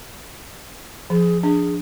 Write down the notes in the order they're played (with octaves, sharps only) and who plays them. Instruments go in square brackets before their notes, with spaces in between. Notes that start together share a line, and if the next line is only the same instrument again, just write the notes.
[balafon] F3 [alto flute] G#4
[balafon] D4 [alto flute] G#4